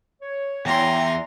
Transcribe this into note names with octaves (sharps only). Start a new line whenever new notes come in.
C#5
E2 G5 A#5 C6